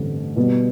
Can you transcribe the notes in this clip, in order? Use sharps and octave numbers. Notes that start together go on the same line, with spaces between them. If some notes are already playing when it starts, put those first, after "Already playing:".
Already playing: A1 G2 D3 A3 C4
B2 G3 B3